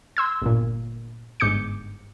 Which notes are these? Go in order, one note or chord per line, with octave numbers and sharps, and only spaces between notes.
C6 E6 G#6
G1 A#2
G1 G#2 D6 G6 C#7